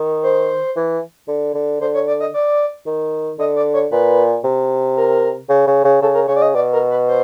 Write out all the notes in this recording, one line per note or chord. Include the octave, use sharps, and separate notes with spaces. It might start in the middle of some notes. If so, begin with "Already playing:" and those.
Already playing: D#3
C5
E3
D3
D3
D3 C5
C#5
D5
D#5
D5
D#3
D3 D#5
D5
C#5
A#2 B4
C3
A#4
C#3
C#3
C#3
C#3 A4
A#4
C#3 C#5
D5
D#5
B2 D5
A#4
B4
C5